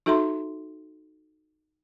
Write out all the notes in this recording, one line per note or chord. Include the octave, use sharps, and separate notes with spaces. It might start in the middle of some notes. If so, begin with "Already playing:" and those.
D#4 F#4 A4 E5 A#5 C6